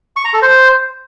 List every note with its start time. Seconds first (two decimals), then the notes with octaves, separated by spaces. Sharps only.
0.16 C#6
0.25 A#5
0.33 A4
0.42 C5